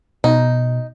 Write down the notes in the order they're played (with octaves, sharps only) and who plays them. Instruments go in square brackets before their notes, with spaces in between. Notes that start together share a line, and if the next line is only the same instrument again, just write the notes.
[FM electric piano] B2 [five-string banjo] D#4